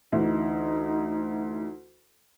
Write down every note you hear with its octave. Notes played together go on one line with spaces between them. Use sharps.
D2 E3 D#4